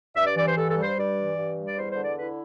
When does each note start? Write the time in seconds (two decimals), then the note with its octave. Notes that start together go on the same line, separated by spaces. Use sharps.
0.16 G2 E5
0.26 D5
0.36 E3 D5
0.46 C5
0.56 G2 A4
0.70 A4
0.76 G3
0.83 C5
0.96 G2 D5
1.16 E3
1.36 G2
1.57 G3
1.66 D5
1.76 E2 C5
1.90 C5
1.96 D3
2.04 D5
2.16 E4 B4